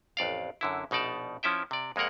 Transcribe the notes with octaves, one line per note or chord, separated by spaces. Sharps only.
A1 F2 D5 F5
F#2 D3 E4
A#1 B2 D#4 D5 A5
F3 C#4 E4 E5 G5
C3 D5
F2 G#3 A#3 A#4 F#5